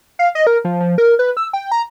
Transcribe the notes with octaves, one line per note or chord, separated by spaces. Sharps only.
F5
D#5
A#4
F3
F3
A#4
B4
E6
G5
A#5